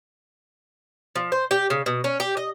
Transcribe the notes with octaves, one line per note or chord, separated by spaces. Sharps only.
F3
C5
G4
C#3
B2
C#4
G4
D#5